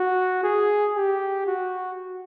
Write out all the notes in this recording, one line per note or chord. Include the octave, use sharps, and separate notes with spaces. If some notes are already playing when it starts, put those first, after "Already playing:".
Already playing: F#4
G#4
G4
F#4